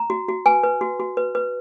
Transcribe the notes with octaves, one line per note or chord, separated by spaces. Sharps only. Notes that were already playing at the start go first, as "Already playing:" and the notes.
Already playing: A#5
F#4
F#4
B4 G#5
B4
F#4
F#4
B4
B4